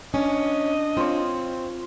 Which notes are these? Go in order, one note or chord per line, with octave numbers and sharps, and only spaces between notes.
C#4 D4 D#5
C4 F4 C#5